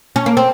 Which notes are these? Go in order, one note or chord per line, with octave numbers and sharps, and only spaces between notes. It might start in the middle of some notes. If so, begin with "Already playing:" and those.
C#4
A#3
C4